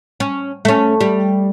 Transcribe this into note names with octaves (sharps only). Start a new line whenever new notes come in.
C#4
A3 C#4
G3